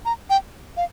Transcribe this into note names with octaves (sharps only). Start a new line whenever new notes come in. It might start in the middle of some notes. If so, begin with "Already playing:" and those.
A#5
G5
F5